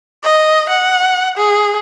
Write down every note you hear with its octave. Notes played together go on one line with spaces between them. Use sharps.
D#5
F#5
G#4